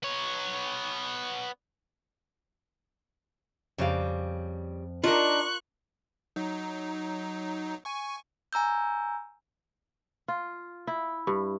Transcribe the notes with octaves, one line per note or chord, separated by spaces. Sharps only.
B3 C#5
F2 C#3 G3 F5
D4 D#4 F4 A#4 C#6 F#6
F#3 D#4
G#5 C#6
G#5 A#5 E6 G6
F4
E4
G2